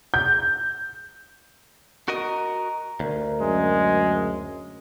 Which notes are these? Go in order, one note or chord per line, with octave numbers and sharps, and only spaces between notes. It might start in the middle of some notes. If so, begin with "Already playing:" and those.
G6
F#4 A#4 D#5 A#5
D2 A#4
F#2 G#3